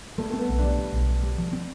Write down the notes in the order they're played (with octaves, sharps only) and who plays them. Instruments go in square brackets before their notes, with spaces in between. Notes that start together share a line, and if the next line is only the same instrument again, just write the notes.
[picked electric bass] G3 [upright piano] A3
[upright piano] A3
[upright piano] B3 [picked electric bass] C4
[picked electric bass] B1
[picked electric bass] G3 [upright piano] D4
[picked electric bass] G3
B1
B1
G3
F3
C4